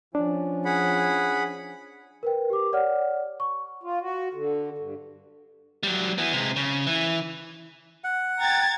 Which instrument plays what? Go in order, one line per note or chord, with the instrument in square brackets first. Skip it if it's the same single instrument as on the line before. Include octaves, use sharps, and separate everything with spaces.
[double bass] F3 C#4 [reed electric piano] D4
[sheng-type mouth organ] G#4 F#5 B5
[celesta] A#4 B4 G5
G4 D6
C#5 D5 F#5 F6
C#6
[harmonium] F4
F#4
D3
G2
[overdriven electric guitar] F#3 G3
E3 B3
C3 G#3
C#3
E3
[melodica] F#5
[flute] G5 [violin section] A#5 G#6 A6